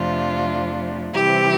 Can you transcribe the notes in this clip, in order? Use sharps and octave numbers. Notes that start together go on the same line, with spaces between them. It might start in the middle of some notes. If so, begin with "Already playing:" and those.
Already playing: F2 C3 F3 A3 D4 F4
C3 E3 G3 C4 E4 G4